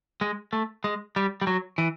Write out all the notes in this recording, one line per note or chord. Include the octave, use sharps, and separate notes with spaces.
G#3
A3
G#3
G3
G3
F#3
E3